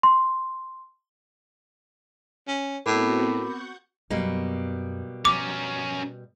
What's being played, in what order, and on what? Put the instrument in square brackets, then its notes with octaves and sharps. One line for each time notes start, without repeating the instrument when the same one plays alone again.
[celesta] C6
[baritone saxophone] C#4
[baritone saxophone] A2 [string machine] B3 C4 F#4 [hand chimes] A#4 B5 D6
[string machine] F#5 C#6 G6
[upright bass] F#2 [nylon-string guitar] B2 G3 A#3
[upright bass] F3 [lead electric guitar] C#4 A#4 [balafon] D6